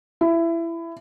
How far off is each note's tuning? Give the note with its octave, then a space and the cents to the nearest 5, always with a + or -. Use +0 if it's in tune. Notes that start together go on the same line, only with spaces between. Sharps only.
E4 +20